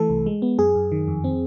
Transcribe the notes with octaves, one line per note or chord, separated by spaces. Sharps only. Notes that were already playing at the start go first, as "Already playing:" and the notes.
Already playing: E3 A3 A4
C2
G#3
B3
F#2 G#4
F#2
D#3
F2
C4